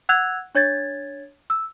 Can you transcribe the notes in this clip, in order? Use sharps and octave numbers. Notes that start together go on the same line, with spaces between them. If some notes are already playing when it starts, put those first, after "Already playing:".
F#5 E6 F#6 G#6 F7
D4 C#5 G#6 A6
E6